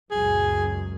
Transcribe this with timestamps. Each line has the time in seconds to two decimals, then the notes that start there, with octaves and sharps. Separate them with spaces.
0.11 C#2 F#2 A#2 G#4